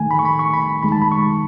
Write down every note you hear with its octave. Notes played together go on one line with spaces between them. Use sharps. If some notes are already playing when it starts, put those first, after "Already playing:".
Already playing: D#2 D#3 A3 G#5
B5
C#6
B5
C#6
B5
D#2 D#3 G#3 B5
A5
B5
C#6